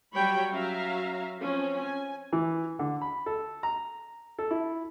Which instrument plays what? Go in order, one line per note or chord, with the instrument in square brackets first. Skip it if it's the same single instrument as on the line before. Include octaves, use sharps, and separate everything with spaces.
[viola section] F#3 G3 C#5 G5 B5
F#3 C#4 E5 F5 A#5
F3 C4 C#4
G#5
[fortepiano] E3
D3
B5
A4
A#5
A4
E4